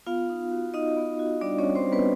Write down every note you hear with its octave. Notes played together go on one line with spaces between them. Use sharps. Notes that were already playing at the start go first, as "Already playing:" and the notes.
B3 F4 F5
D#4
F#4
D#4 D#5
B3
F#4
G3 D4 D5
C#4 C#5
G3
C4 C5
G3
B3 B4